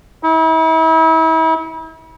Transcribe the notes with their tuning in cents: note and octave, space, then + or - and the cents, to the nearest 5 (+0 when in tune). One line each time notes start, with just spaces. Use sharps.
E4 -40